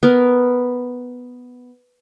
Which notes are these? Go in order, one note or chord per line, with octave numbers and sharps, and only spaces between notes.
B3 A#4